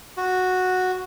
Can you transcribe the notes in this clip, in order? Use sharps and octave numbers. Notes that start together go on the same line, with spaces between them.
F#4